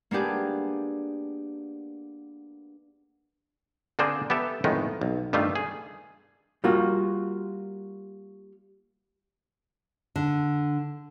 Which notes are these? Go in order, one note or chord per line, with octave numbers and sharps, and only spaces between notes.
A#3 B3 D4 G4 G#4
D3 A#3 C4 D4 G#4 C5
B3 G4 A4 E5
F2 A2 D#3 G#3 B3 D#4
B1
G2 D#3 G3 A3 F4
G#4
G3 A#3 F4 F#4
D3